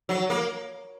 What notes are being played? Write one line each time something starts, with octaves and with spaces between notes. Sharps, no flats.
F#3
A#3